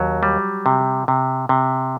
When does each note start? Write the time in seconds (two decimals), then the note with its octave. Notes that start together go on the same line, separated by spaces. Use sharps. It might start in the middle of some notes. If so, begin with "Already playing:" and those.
Already playing: D#2 F#3
0.23 G3
0.66 C3
1.08 C3
1.49 C3